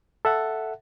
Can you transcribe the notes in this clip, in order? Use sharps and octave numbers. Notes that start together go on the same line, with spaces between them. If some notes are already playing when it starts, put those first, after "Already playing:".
A4 E5 F#5